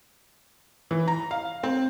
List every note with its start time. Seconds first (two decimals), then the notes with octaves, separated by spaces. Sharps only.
0.91 E3
1.08 A#5
1.31 F5
1.63 C4